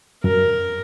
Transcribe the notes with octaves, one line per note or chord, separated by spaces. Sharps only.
F#2 A#4